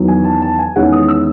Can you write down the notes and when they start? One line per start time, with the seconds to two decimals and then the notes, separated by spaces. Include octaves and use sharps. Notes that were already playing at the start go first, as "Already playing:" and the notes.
Already playing: E2 D#3 F#3
0.08 G#5
0.24 A5
0.42 A5
0.59 G#5
0.76 E2 D#3 G#3 C#4 E4 F#5
0.92 D#6
1.08 E6